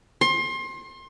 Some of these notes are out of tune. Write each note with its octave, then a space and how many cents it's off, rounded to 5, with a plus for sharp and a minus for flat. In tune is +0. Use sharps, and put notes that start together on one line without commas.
C6 +30